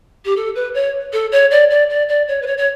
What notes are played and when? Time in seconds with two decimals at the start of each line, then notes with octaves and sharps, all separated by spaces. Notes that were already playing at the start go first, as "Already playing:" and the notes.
0.25 G4
0.36 A4
0.55 B4
0.74 C#5
1.12 A4
1.31 C#5
1.50 D5
1.70 D5
1.89 D5
2.08 D5
2.28 C#5
2.41 B4
2.46 C#5
2.57 C#5